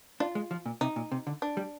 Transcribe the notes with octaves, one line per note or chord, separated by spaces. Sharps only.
D4 F4
G#3
F3
A#2
C3 D#4
A#2
C3
D3
D4
G3